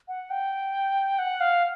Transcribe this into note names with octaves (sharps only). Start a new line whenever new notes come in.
F#5
G5
F#5
F5